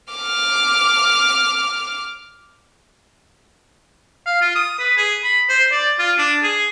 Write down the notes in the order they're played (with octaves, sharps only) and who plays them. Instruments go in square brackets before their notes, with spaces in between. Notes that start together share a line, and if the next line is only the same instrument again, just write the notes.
[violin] D6 F6
[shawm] F5
F4
D#6
B4
G#4
B5
C5
D5
F4
D4
G#4